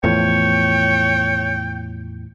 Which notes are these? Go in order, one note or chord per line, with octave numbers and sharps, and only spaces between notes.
E2 A2 F3 C#5 G5